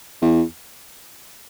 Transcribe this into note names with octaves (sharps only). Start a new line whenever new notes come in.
E2